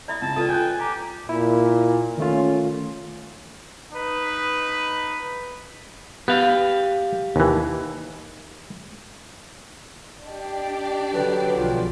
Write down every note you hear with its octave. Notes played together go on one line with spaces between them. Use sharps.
D5 E5 A#5 B5 D#6
C#2 A5
C#2 F4 A4 B4 D5
G5 G#5 F#6
G4 A#5
A#2 E4
D#3 A3 C#4 F4
D#4 B4
B3 G4 F5
D#2 E3
D4 G4 D5 D#5
D3 F#3 B4
B1 F3 G#3 F4